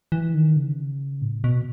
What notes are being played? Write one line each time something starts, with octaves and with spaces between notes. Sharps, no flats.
E3
D#3
C#3
A2
B2